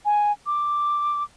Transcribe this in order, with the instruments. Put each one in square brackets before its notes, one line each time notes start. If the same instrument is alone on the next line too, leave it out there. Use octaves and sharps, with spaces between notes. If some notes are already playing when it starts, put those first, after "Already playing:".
[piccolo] G#5
D6